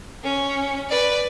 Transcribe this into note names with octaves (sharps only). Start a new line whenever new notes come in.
C#4
B4 D5